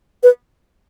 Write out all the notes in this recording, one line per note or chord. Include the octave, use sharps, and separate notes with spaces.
B4